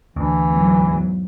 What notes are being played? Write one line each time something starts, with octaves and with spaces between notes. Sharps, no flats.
D2 D3 E3
E2 G#2 F#3